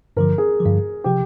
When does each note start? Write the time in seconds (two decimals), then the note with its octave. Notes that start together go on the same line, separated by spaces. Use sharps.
0.17 G2 D3 F3 A#4
0.38 G#4
0.60 G2 D3 F3
1.04 C3 F3 G4